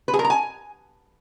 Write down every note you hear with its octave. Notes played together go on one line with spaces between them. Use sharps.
B4
G#4
A#4
A#5
G#5